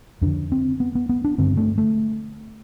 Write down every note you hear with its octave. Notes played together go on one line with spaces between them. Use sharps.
F2 D3 D4
C4
B3
B3
B3
D4
G2 D3 C4
A3
A3